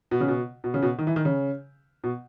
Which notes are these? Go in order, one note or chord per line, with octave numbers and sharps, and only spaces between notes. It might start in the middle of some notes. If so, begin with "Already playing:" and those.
B2
C#3
B2
B2
C#3
B2
D#3
E3
D#3
C#3
B2